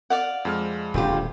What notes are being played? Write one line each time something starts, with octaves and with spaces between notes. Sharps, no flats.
D5 F5 F#5
F2 G#3 F6
D#1 D2 F4 G4